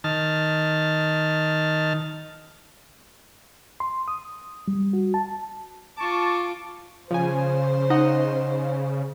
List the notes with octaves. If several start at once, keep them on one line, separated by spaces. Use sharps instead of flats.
D#3 A5 F6
C6
D#6
G3
F#4
A5
F4 A5 C#6 D6
C#3 F3 C5 G#5
D#4 D#5 F#5